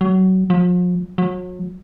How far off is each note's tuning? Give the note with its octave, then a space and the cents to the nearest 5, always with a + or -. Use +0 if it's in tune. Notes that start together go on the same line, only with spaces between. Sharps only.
F#3 +20
F3 +40
F#3 -35